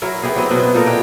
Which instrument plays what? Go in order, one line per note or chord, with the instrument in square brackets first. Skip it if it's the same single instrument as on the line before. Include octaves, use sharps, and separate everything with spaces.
[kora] F#3 E4 A#4
B3 E4 G4 G#4
F#3 C4 D#5
B2 F#3 B3
A#2 D#4 A4 A#4
E4 G4 B4 G5